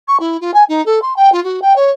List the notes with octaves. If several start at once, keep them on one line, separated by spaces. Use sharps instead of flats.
C#6
E4
F4
G#5
D#4
A4
C6
G5
F4
F#4
G5
C#5